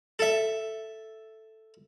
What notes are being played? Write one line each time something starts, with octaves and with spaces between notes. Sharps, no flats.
A4 E5